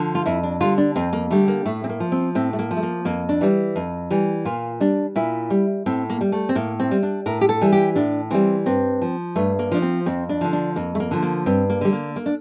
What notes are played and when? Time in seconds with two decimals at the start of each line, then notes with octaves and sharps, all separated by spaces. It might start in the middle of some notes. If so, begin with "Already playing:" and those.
Already playing: D3 F3
0.15 F4
0.26 F2 E4
0.43 D4
0.60 D3 G3 F4
0.78 D4
0.96 F2 C4
1.13 A#3
1.30 D3 G3 A3
1.48 A#3
1.65 A2 A3
1.84 C4
1.89 A#3
2.00 F3
2.12 C4
2.35 A2 C4
2.53 A3
2.59 A#3
2.71 F3
2.77 A3
2.83 A#3
3.05 F2 A#3
3.29 D4
3.41 E3 G3
3.76 F2
4.11 E3 G3
4.45 A#2 F4
4.80 G3 D4
5.16 A#2 E4
5.50 G3
5.86 A2 C4
6.10 A#3
6.21 G3
6.32 A3
6.49 C4
6.55 A2 A#3
6.80 C4
6.91 G3
7.03 D4
7.26 A2 A#4
7.41 G4
7.49 A4
7.61 E3 G3
7.72 G4
7.96 A2 D4
8.30 E3 G3 C4
8.66 G2 C4
9.02 F3
9.36 G2 A3
9.59 A#3
9.72 F3 D4
9.82 C4
10.06 F2 C4
10.29 D4
10.41 D3 F3
10.53 D4
10.76 F2 A#3
10.95 A3
11.00 A#3
11.11 D3 F3
11.23 A#3
11.46 G2 C4
11.70 A#3
11.81 D3 G3
11.93 A#3
12.16 A#3
12.26 D4